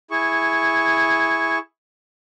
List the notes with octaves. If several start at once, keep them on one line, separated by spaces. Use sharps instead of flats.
E4 G#4 C#6